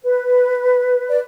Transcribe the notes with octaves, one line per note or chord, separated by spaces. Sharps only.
B4
D5